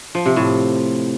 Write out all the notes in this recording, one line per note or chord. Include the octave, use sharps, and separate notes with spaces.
F3
C3
A2